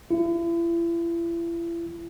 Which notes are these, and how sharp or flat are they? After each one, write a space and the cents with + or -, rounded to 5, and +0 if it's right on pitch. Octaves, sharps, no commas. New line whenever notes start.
E4 +40